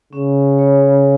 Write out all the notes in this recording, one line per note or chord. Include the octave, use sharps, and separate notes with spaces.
C#3 C#4
C#5